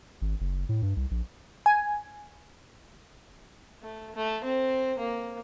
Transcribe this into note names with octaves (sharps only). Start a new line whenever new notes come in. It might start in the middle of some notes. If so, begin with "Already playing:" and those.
G#1
F#1
A2
G2
C2
A#1
G#5
A3
A3
C4
A#3